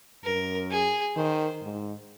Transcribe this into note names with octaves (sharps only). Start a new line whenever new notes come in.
F#2 A#4
G#4
D#3 C5
G#2